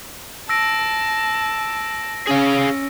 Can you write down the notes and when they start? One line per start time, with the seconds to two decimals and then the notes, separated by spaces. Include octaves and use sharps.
0.49 A5 E6 A#6 D7
2.27 C#4 G#4 F5